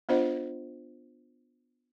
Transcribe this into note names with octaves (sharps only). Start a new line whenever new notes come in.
B3 D4 F4 C5 D#5 F#5